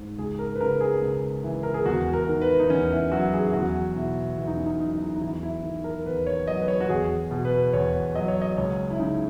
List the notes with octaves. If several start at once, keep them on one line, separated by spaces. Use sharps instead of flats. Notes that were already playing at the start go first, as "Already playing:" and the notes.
Already playing: G#2
C#2 G#4
A#4
B4
C#3 A#4
G#4
C#2
E3
A#4
G#4
E2 F#4
A#4
D#3
B4
D#4
E2 C#4
E4
F#3 F#4
G#4
E4
E2 F#4
B2 E4
E2 E4
D#4
C#4
D#4
F#3 D#4
E4
D#4
D#4
E2 E4
E4
D#3
A#4
E2 B4
C#5
F#3 D#5
B4
C#5
F#4
E2 G#4
B2
B4
E2 C#5
F#3 D#5
C#5
D#5
C#2 C#5
E4
C#3 D#4